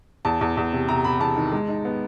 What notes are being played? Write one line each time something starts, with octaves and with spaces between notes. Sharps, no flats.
E2 A5
E2
E2
C3
C3 A#5
C3 B5
E2 A5
D#3
G#3
D#4
B3